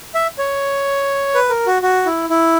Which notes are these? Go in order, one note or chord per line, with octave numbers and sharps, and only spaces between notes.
E5
C#5
B4
A#4
F#4
F#4
E4
E4